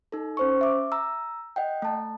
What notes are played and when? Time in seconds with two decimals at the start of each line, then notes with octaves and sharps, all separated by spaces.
0.12 D#4 A4
0.37 C#4 C5 C#6
0.61 E5 D6
0.92 A#5 E6
1.56 D#5 F#5 G5
1.82 A3 A5